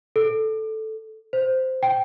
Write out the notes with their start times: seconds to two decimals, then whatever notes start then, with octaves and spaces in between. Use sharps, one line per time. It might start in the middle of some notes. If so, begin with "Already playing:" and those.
0.16 A4
1.33 C5
1.83 G5